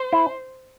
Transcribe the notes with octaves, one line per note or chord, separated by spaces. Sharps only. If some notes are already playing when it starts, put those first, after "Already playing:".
Already playing: C5
E4